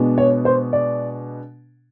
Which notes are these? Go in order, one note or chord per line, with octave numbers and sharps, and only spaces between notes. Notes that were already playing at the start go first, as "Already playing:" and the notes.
Already playing: B2 G#3 B3 D4
C#5
C5
D5